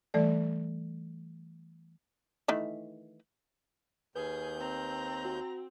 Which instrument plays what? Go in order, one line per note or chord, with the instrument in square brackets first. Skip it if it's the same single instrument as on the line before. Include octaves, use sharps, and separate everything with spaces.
[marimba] E3 G3 A3 A4 D5
[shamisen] D#3 E3 A3
[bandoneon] D#2 G6 [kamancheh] G#4 [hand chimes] B4
[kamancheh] C4 [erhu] A#5
[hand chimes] F#4